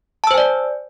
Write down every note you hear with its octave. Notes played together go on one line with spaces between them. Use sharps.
C5 D5 G#5 A5 E6